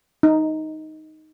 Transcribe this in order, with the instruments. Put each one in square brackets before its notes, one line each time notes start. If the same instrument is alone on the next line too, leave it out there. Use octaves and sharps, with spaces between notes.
[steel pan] D#4